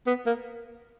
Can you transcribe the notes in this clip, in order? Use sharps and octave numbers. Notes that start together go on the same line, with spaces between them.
B3
A#3